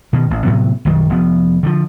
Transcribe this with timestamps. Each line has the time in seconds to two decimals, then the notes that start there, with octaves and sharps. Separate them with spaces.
0.13 B2 D#3
0.30 A1
0.45 A2 C3 F#3 B3
0.85 B1 F#2 D#3 G3
1.10 F1 F3 B3
1.63 D3 D#3 F3